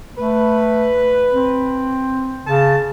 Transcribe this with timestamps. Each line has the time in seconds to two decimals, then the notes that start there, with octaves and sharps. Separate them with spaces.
0.17 A3 B4
1.32 C4
2.46 C#3 A5